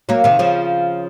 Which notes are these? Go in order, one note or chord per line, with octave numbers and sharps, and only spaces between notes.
F#3 A#3
C3 D#3
C#3 F3